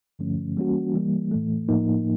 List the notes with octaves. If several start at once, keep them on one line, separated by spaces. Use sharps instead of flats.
G2 D3 F3 A3 C#4
E3 G3 A#3 C#4 F#4
E3 G3 A#3
A2 E3 A3
A2 F3 A#3 D#4